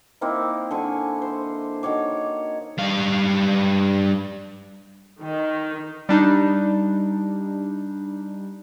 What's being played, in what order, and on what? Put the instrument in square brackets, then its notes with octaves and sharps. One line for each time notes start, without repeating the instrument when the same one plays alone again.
[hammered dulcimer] A#3 C4 D#4 E4
D3 G#5 C#6
C5
D#3 F#4 C#5 D6
[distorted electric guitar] G2 F5
[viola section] D#3
[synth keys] G3 D4 D#4